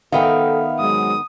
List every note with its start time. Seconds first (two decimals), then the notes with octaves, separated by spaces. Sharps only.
0.12 D#3 B3 A4 E5 F5 G5
0.80 G#2 F#3 G#3 D#6